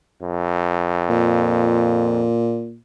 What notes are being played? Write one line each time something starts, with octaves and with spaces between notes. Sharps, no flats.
F2
A#2